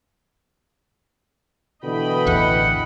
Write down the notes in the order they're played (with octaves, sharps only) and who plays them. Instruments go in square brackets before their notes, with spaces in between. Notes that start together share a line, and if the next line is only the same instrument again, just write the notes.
[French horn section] B2 D3 E3 [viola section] D#5 G5 B5
[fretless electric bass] A1 E2 [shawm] F#5